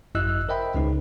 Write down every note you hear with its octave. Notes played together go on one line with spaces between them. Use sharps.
G#1 F#2 E4 D#5 E6 F#6
A#4 C5 D#5 E5 G5 B5
C#2 C#3 G#3 D#4 B4